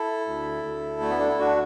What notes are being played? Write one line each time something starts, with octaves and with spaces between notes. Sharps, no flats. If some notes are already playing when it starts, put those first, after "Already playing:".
Already playing: E4 A4
D2
D2
D3 A3
B3
D4
E4
D2 D4 F#4